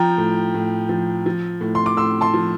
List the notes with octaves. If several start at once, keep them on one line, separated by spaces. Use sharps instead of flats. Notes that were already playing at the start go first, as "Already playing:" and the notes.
Already playing: F3 G5 A#5
A2
A2
F3
F3
A2
C6
D6
A2 C6 E6
A5 C6
F3